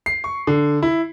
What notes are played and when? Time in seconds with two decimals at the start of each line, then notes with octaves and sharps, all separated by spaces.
0.06 C7
0.24 C#6
0.47 D3
0.83 E4